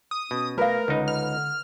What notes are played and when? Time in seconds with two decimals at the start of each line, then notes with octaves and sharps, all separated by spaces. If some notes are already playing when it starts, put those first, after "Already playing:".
0.11 D#6
0.31 B2 C#4
0.58 A3 A#4 B4 F5
0.88 C#2 D3 D#4
1.08 F6